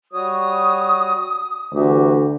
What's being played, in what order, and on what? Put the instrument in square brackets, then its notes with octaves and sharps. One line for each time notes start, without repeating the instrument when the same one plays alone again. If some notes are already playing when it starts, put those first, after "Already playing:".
[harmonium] G3 F#4 C#5 [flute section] D#6
[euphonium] D2 [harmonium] E3 F#4 G4